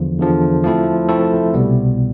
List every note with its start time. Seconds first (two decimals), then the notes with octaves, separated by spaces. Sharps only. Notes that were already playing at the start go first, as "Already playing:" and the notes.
Already playing: E2 D3 F3
0.19 E2 D3 F3
0.64 F3 A3 C4 E4 A4
1.09 F3 A3 C4 E4 A4
1.54 C2 B2 G3 B3